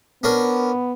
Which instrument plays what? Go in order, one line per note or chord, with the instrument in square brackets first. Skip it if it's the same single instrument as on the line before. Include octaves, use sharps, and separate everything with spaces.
[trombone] B3 [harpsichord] C#4 D4 A#4